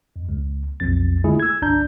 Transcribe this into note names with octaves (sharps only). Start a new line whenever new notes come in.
F2
C#2
B1 F2 A6
D3 G#3 A3 E4 F4 G#4
E6 G#6
G1 C2 D4 A#5 G6